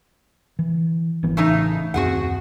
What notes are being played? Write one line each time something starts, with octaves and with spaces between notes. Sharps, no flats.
E3
G1 E3 B3
A1 C#3 E3 A3 D#4
D#1 F#2 C4 F#4 G#4 F#5